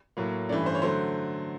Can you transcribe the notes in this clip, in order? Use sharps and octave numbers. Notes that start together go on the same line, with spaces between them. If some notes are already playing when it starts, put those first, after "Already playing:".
A2 F#3 A#3
G2 E3 A3 C#4 D5
C5
C#5
D3 F#3 A3 C5